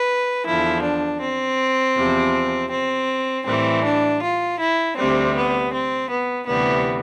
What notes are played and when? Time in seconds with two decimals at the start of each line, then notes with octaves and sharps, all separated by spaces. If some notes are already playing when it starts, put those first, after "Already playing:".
Already playing: B4
0.45 E2 D3 F3 E4
0.83 D4
1.21 C4
1.96 E2 C3 F3
2.71 C4
3.46 A2 E3 G3 C4
3.83 D4
4.22 F4
4.60 E4
4.97 D2 C3 G3 C4
5.35 B3
5.73 C4
6.10 B3
6.47 D2 C3 E3 G3 B3